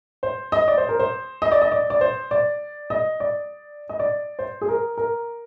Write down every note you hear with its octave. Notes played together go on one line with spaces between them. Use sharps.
C5
D#5
D5
C5
A#4
C5
D#5
D5
D#5
D5
D5
C5
D5
D#5
D5
D#5
D5
C5
G#4
A#4
A#4